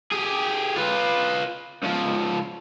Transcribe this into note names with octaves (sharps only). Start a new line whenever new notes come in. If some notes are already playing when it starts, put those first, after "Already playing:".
G4 G#4
F4 B4
C#2 F3